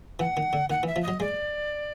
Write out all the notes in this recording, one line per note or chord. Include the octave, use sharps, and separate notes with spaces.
E3 F#5
D#3
D3
D#3 F#5
E3
E5
F3
F#3 D#5
G#3 D5